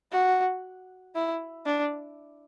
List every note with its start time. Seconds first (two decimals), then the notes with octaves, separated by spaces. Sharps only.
0.12 F#4
1.15 E4
1.66 D4